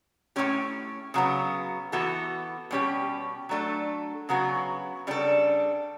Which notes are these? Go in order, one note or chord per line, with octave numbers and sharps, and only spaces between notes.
A2 F#3 C#4 G4
C#3 F#3 B3
E3 B3 F#4 A4
B2 G3 C#4 G4
F#3 A3 D4 A4
C#3 F#3 B3 F#4
C#3 G3 D4 A4